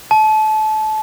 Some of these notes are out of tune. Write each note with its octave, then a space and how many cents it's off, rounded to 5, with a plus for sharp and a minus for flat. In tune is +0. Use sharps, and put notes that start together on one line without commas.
A5 -25